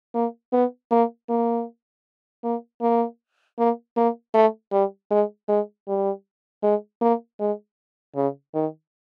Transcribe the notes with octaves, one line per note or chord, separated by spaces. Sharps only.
A#3
B3
A#3
A#3
A#3
A#3
A#3
A#3
A3
G3
G#3
G#3
G3
G#3
A#3
G#3
C#3
D#3